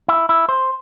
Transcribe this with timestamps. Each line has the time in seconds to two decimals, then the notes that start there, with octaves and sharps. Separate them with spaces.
0.08 E4
0.29 E4
0.49 C5